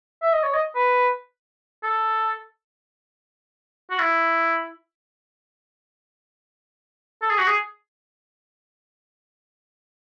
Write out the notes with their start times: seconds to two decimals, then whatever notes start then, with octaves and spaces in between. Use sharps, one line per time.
0.22 E5
0.33 D#5
0.43 C#5
0.54 D#5
0.75 B4
1.83 A4
3.91 F#4
3.99 E4
7.22 A4
7.30 G#4
7.39 F#4
7.48 G#4